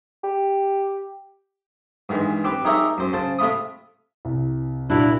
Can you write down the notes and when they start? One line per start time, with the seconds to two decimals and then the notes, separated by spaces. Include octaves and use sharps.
0.23 G4
2.09 G2 D#3 E3 G#3
2.44 C4 G4 B4
2.65 D#4 G4 G#4 A#4 C#5 E5
2.98 F#2 C5
3.13 C#3 C5 A5
3.39 C3 A3 F4 B5 D#6
4.25 C2 C3
4.90 A#2 D4 E4 F#4 A#4